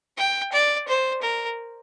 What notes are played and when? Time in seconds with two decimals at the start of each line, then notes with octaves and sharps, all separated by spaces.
0.18 G5
0.53 D5
0.88 C5
1.22 A#4